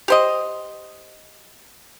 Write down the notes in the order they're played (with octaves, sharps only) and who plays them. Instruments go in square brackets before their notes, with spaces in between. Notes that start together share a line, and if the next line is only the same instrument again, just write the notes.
[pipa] G4 C5 D#5